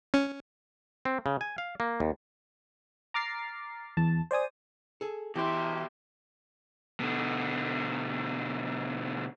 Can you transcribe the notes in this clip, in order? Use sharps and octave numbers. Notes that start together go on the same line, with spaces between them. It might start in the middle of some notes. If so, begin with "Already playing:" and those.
C#4
C4
C#3
G#5
F5
A#3
D#2
A#5 D6 F6 A6 C7
E2 A5
C5 D5 G#5 D#6
G#4 A4
B2 E3 E4 G4 E5 C6
B2 D3